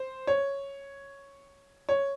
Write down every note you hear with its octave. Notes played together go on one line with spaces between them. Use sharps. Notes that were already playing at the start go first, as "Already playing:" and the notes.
Already playing: C5
C#5
C#5